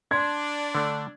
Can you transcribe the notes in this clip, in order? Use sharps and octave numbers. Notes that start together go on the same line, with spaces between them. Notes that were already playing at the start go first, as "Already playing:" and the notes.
D4 C6 G#6
D3 A3